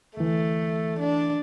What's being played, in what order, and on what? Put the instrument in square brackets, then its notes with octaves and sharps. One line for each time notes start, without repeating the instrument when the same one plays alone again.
[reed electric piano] D2 E3 [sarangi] A3
[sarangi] D4